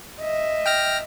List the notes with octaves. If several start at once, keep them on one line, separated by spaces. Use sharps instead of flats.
D#5 E5
G5 F6 A#6